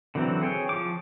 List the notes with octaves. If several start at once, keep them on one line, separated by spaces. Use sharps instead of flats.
D3 E3 F#3 C4
G#4 C#5 G5
F3 D6